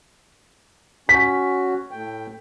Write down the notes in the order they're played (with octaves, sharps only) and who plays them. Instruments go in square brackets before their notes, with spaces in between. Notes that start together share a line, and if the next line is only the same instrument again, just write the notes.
[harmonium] C#4 F#4 [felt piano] B6
[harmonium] A2 G5